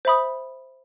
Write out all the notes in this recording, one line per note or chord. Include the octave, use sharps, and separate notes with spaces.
C5 E5 B5 D#6